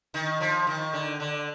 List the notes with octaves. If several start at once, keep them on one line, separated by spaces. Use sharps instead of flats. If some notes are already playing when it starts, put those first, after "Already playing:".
D#3
F3
D#3
D3
D3